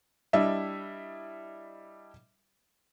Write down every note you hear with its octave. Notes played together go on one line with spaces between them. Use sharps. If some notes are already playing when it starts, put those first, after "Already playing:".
G3 D4 E4 D#5 E5